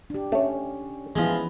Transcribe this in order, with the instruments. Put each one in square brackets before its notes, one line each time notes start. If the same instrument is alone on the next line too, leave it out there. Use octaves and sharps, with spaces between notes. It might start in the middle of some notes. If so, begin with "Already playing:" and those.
[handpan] D4 G4
[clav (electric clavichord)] A3 C#5 [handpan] C#4
[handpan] E3 B3 E4 [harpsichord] F3 G#3